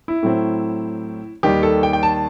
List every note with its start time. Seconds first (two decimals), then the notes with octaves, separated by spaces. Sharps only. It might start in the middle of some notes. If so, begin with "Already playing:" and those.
0.08 E4
0.23 A2 F#3 C4
1.43 D#2 D#3 G3 G4
1.63 A4
1.83 G5
1.93 G5
2.03 A5